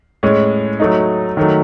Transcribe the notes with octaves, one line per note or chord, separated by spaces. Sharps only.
A2 G#3 C#4
F#3 A3 D#4
D#3 F#3 A3